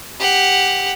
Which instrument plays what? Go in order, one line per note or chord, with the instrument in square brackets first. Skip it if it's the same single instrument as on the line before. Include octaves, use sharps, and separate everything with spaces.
[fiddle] G4 F#5